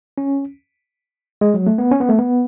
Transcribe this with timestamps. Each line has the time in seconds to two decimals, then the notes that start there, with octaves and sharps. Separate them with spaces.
0.18 C#4
1.41 G#3
1.54 F#3
1.67 A3
1.78 B3
1.91 C#4
2.00 B3
2.09 A3
2.19 B3